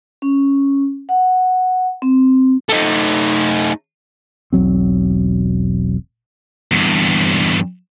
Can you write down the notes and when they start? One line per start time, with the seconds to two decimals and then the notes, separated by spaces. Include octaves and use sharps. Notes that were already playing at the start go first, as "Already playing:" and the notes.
0.22 C#4
1.09 F#5
2.02 C4
2.69 A3 D#4
4.53 E1 B1 F#3 C4
6.72 E2 G2